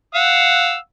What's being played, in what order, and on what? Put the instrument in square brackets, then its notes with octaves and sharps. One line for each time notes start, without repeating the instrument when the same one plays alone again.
[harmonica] F5 F#5 E6